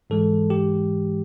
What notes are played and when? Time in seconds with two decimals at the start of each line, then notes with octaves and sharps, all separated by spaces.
0.10 G#2 E3 G#3 A4
0.50 G4